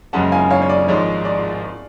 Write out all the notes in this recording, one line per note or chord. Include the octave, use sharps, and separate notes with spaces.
F#1 F#2 C#3 G#3 C#4 F#5 A5
F5 G#5
C#5 F5
C#5
D5
G#1 G#2 F3 G#3 C#5
D5